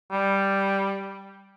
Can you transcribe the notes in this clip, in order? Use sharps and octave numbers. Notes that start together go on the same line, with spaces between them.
G3